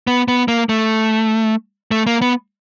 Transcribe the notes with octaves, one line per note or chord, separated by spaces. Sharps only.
B3
B3
A#3
A3
A3
A#3
B3